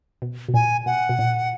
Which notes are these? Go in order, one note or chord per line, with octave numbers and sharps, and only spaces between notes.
B2
B2
A#2 G#5
B2 F#5
B2
A#2